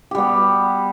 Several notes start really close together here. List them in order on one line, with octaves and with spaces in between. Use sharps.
G4 G3 B3